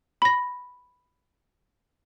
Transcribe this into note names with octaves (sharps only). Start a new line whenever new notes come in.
B5 A#6